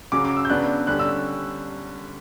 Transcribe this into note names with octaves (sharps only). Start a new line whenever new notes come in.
C#3 F#3 C#4 D6
D6
E6
G6
C#3 F#3 B3 D4 F#6
D3 G3 C#4 F#6
E6